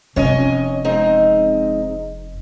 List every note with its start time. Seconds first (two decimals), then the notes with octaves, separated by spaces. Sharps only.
0.16 F1 C#4 C#5 D#5 G#5
0.85 G#3 C4 D#4